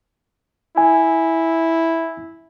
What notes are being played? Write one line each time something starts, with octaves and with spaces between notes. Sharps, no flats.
E4 G#5